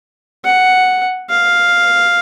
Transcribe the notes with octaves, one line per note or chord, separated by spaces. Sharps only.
F#5
F5